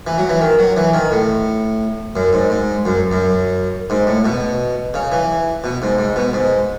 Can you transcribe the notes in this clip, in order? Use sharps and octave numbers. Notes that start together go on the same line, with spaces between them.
E3
F#3
E3
D#3
F#3
E3
D#3
A2
F#2
G#2
G#2
F#2
F#2
G#2
A2
B2
C#3
E3
B2
G#2
G#2
B2
G#2